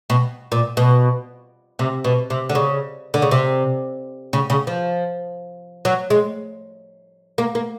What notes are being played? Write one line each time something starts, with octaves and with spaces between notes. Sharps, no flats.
B2
A#2
B2
C3
B2
C3
D3
C#3
D3
C#3
C3
C#3
C#3
F3
F#3
G#3
A#3
A#3